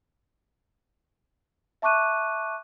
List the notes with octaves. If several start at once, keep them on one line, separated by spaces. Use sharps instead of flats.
E5 A5 C#6 D6 F#6 D#7